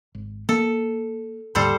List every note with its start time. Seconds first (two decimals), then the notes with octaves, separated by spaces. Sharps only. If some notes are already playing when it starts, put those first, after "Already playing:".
0.15 G#1
0.49 A#3 A4
1.55 D#2 G#2 D3 G3 A4 C5